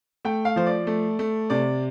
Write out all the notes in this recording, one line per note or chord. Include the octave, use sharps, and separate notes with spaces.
A3 G5
F5
F3 C5
D5
A3
A3
C3 D5